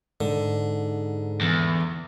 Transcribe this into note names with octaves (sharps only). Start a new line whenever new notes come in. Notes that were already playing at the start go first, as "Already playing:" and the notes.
G#2 D3
E2